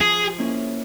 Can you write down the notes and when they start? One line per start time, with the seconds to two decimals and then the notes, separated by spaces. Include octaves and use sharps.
0.01 F3 G#4
0.38 A#3 C#4 E4